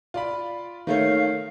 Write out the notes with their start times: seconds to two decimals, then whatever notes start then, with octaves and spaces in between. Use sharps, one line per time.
0.14 F4 D5 B5
0.87 D#3 A3 C#5 F5